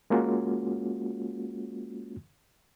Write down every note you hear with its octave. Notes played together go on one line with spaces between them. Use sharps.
G#3 A#3 C#4 F4 F#4